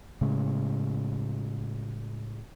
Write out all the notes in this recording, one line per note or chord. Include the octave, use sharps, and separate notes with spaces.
A2 C#3 G#3